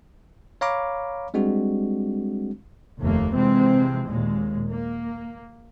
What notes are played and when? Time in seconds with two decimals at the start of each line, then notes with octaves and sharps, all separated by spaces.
0.61 C#5 F5 A#5 B5 D6
1.34 G3 G#3 C4 D4 F#4
3.00 F1 D#2 A3 A#3
3.34 C3 E3 F3 G#3 C4
4.07 D#2 A#2 G#3
4.70 A#3